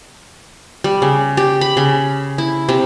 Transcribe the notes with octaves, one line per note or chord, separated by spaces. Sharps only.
G3
C#3
G4
B5
C#3
E4
C3